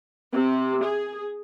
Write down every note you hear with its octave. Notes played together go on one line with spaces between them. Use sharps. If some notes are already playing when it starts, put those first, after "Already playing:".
C3
G#4